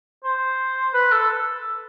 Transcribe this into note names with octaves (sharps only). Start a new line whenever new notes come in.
C5
B4
A4